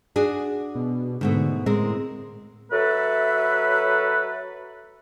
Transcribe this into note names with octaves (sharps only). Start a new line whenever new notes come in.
D4 F#4 G#4
B2
G#2 B2 D3 A3
A2 G#3 C4 A#4
F#3 A4 B4 E5